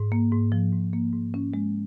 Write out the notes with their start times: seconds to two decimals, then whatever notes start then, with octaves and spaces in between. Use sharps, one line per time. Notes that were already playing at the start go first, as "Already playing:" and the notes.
Already playing: G#2
0.12 A#3
0.32 G#2
0.52 F3
0.73 G#2
0.93 A#3
1.13 G#2
1.34 C#4
1.54 G#3